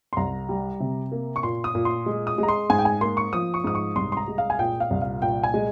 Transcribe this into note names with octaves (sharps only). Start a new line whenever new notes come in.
C6
C2 A#5
G3
C3
A#3
C#6
A#2 C6
D#6
A#2
C6
G#3
D#6
G#3 A#5
C6
G#2 G#5
G5
G#5
A#3 C6
C#6
F3 D#6
C#6
G#2 D#6
C#6
C2 C6
C6
A#5
G#3
F5
G#5
A#2 G5
F5
C2
F5
A#2 G5
G#5
G#3